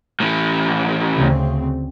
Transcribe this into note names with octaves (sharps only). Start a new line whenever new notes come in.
A2 E3
D2 C#3 C4